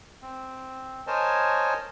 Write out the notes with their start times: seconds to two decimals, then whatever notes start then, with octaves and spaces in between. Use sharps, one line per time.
0.22 C4
1.07 A#4 C5 C#5 D#5 G#5 A5